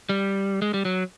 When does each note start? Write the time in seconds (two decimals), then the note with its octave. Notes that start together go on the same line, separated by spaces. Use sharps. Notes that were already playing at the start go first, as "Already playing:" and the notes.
0.09 G3
0.62 G#3
0.74 G3
0.85 F#3